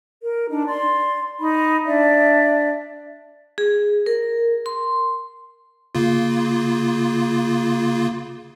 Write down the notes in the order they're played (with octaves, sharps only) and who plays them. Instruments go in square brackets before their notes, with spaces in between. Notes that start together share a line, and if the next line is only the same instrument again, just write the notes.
[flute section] A#4
D4 D#4
D5 C6
D#4 B5
D4 D5 E5
[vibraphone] G#4
A#4
C6
[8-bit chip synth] C#3 A#3 F4